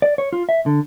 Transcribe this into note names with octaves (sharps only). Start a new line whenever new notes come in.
D5
C#5
F4
E5
D3